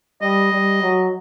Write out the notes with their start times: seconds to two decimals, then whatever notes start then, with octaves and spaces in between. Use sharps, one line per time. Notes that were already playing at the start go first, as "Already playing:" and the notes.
0.22 G3 D#5
0.53 G3
0.82 F#3